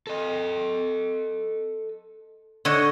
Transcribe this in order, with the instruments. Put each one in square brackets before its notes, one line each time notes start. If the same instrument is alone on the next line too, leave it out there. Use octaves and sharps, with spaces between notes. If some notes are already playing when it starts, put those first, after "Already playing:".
[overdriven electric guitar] A4 D#5
[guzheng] D3 C#5 D#5